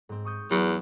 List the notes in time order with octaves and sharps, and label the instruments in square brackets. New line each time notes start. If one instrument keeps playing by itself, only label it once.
[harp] G#2 C4
C#6 D#6 G6
[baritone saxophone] E2 [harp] F#3